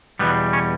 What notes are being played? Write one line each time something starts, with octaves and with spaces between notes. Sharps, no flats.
E2 B2 G3 B3
C#4